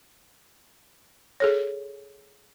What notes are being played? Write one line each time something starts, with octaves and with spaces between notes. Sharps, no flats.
G#4 A4 C#5